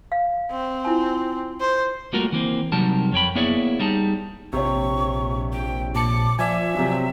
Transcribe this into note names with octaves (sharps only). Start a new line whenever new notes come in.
F5
C4
E4 F4 G#5
C5
G3 A3 A#3 F4 F#4 A#4
E3 A#3 C4
C3 F#3 G3 D#4 A#4 A5
F2 C#5 G5 B5
A#3 B3 E4 G#4 C#5 D5
G3 D#4 G#4 A5
A#1 C3 C#5 C#6
G5
A#2 A5 D6 C#7
F3 D5 E5 G#5
C3 F#3